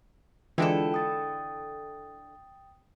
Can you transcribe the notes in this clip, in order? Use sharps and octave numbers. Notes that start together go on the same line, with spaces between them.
D3 E3 G#3 D4 E4 F4 A4 G5
G5 D#6 A6